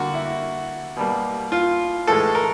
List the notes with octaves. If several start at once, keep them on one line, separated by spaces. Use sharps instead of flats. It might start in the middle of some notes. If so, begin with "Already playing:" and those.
Already playing: D3 G3 A#3 F#4
E4
B2 G3 A#3
F4
A2 E3 G#3 A4
A#4